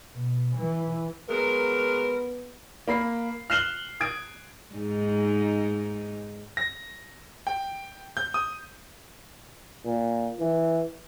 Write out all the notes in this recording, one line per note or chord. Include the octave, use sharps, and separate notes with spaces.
B2
E3
F#3 G#3 B3 A#4
A#3 B5 C7
F6 F#6 C7 E7 F#7 G7
D#6 G#6 D7
G#2 D#4
A#6
G5
G6
D#6
A#2
E3